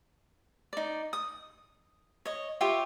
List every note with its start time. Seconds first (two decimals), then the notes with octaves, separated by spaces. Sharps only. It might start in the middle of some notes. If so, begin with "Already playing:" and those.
0.73 D#4 D5
1.13 D#6
2.25 C#5 D#5
2.61 F4 G4 C#5 E5